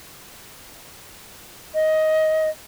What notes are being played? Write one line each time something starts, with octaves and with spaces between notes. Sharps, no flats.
D#5